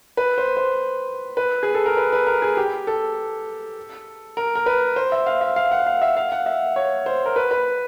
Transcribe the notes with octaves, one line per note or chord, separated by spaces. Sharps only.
B4
C5
C5
B4
G#4
A4
A#4
B4
B4
A#4
G#4
G4
A4
A#4
A#4
B4
C5
E5
F5
E5
F5
F#5
F5
E5
F5
F#5
E5
C#5
C5
A#4
B4
B4